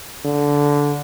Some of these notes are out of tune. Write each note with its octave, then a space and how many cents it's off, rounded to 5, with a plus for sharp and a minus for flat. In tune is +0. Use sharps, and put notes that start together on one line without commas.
D3 -15